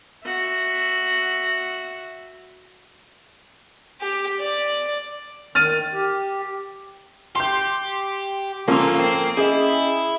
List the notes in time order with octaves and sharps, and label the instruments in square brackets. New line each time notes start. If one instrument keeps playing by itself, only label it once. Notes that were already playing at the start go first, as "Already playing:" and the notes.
[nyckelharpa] F#4 E5
[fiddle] G4
D5
[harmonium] D#3 [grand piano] F6 A6 D#7
[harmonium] G4
[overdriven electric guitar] G4 [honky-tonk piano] C6 G6
[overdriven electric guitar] G#2 F4 [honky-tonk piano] F3 A#3 C#4 [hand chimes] A4 E6
[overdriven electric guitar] C4
[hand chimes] C#4 D#5 [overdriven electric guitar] E4 [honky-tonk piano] G#4